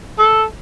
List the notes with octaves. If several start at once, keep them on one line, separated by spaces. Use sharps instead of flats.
A4